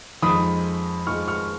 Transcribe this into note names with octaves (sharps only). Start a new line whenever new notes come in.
F2 F3 G#3 D#4 B5 D#6
F2 F3 G#3 D#4 C#6 F6
C#6 F6